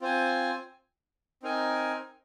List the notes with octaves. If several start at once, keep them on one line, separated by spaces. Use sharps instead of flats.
C4 F4 C5 G#5
C4 D#4 A#4 G#5